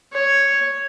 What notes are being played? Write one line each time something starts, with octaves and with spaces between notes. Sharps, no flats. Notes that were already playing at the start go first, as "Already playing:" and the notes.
C#5